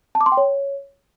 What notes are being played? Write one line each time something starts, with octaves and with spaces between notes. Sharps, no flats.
A5
D6
C6
G5
C#5